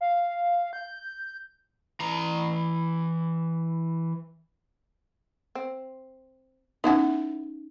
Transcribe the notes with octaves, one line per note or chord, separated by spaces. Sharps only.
F5
G6
E3 A#5
C4
B3 C#4 D#4 E4 F#4